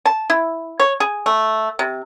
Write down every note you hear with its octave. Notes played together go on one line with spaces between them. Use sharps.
A5
E4
C#5
G#4
A3
C3